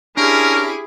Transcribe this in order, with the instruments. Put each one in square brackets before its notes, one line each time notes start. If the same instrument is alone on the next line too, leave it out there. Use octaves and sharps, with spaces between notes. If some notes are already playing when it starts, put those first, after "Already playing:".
[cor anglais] C#4 [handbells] D4 [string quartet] E4 G4 G#4 [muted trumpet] A#4